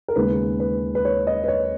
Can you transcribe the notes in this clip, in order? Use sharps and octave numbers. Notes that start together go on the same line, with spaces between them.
A#4
D#2 C#3 G#3 B3 B4
B4
B4
C#5
D#5
B4
C#5